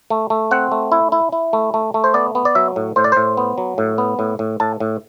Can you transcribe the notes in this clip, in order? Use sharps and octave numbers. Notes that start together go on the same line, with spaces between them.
A3
A3
C4 F#5
A3
E4
E4
E4
A3
A3
A3
C5
B3 D5
B3
D5
F#3 E5
A2
A2 C5
D5
A2 C5
B3
F#3
A2
B3
A2
A2
A2 A5
A2